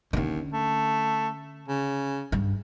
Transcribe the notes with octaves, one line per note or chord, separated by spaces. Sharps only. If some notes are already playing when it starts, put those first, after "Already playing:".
D#2 D3 C#4
A3
C#3
G2